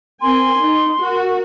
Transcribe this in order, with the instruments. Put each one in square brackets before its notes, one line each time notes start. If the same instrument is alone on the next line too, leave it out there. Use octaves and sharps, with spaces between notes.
[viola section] C4 A#4 G#5 [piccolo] C6
[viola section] D#4
F#4 A#4